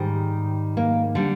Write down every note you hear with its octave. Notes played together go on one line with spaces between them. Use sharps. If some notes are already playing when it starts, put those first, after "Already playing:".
Already playing: G#2 D#3 G3
A#3
D3 G3